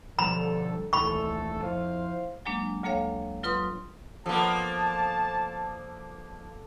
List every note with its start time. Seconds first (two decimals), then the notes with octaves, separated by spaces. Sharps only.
0.19 B2 D3 F3 G3 A4 A#5 B5
0.93 D#1 C2 E3 A3 A4 B5 C#6
1.62 F2 E4 C5 F5
2.45 F#3 G#3 A#3 D4
2.83 D2 G3 A#3 A4 C#5 F5
3.43 F#3 F4 B4 C6 D#6
4.26 F3 A#3 B3 D4 A4 A5